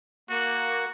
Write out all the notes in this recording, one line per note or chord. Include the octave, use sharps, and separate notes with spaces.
A#3 F#4